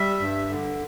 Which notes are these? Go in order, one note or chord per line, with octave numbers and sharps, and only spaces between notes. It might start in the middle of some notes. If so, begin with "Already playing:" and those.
Already playing: G3 E5
G2
D3